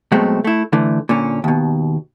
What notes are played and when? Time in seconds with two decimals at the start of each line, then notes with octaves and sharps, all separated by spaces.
0.12 B2 F#3 G#3 A3 C4
0.44 A3 E4
0.73 D3 E3 A3
1.09 A#2 D3 C#4
1.44 D#2 B2